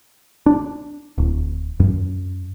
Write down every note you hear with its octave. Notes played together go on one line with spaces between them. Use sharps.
D4
D1
F#2